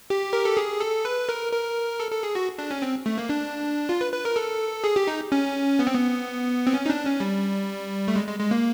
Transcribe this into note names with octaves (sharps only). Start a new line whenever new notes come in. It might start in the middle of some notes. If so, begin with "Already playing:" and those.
G4
A#4
A4
G#4
A4
B4
A#4
A#4
A4
A4
G#4
F#4
D4
C#4
C4
A3
A#3
D4
F4
B4
B4
A#4
A4
G#4
G4
D#4
C#4
B3
C4
B3
C4
C#4
D#4
D4
C#4
G3
A3
G#3
G#3
G#3
A#3